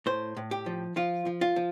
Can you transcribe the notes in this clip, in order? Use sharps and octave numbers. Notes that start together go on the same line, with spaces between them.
A2 C5
A2
G4
F3
F3 F4
F3
F4
F3